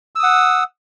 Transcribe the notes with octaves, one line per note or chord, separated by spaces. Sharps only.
F#5 D#6 E6